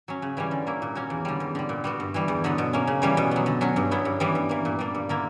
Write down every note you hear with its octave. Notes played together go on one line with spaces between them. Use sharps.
F#3 C#4
C#3
E3 G3 C#4
D3
A#3 E4
A#2
A#3 C#4 F#4
E2
D3 G3
E2
D3 G3
A#2
G3 B3 F#4
G2
E3 G3
E2
D3 F#3 B3
B2
A#3 C#4
C#3
E3 G3 C#4
B2
F#3 B3
D3
F#3 C#4 F#4
G2
F#3 B3 E4
G2
E3 G3 B3
G2
E3 A#3
A#2
G3 A#3 D4
G2
D3 A#3 E4